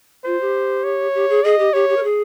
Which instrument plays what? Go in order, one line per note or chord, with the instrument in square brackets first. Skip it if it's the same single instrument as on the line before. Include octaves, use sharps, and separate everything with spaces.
[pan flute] F4 [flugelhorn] C5
[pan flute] G4
[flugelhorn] C#5
[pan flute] G4
G#4
[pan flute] G#4 [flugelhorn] D#5
[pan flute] G4
[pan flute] G4 [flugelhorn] C#5
[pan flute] G4
A#4
G#4